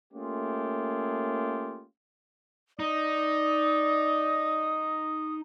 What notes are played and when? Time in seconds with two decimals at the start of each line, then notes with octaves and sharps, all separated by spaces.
0.13 A3 A#3 C#4 F4 G4 G#4
2.80 D#4 D5 D#6